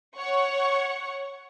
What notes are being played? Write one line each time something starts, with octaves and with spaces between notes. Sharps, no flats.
C#5 F#5 C#6